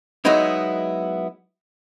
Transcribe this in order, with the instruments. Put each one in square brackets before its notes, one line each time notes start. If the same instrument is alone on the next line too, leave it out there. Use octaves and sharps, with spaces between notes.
[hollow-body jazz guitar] F#3 G#3 B3 D#4 E4